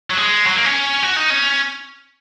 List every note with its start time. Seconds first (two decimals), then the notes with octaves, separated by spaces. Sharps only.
0.11 F#3
0.18 G#3
0.47 F#3
0.56 A#3
0.65 C#4
1.03 F#4
1.17 D#4
1.31 C#4